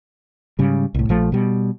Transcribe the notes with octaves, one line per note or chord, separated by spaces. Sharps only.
G#2 C#3 G3
C2 A2
A#1 F3 A3
B2 G3